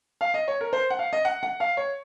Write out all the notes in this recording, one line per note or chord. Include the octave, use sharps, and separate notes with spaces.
F5
D#5
C#5
A#4
C5
F#5
F5
D#5
F#5
F#5
F5
C#5